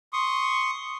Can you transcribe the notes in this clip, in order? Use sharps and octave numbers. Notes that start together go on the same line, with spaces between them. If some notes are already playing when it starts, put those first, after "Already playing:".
C6 C#6 D#6